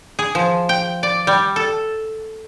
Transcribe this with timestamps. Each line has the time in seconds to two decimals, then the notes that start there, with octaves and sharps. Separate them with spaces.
0.19 G#4
0.35 F3
0.69 G5
1.03 D5
1.27 G3
1.56 A4